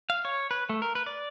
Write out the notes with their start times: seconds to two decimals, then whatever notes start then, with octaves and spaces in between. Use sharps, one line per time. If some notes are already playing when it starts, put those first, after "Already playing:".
0.10 F5
0.25 C#5
0.51 B4
0.69 A3
0.82 A#4
0.95 B4
1.06 D5